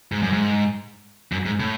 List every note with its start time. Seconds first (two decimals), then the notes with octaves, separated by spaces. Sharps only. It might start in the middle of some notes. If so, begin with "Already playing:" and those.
0.12 G#2
0.23 F#2
0.33 G#2
1.32 F#2
1.46 G#2
1.60 A2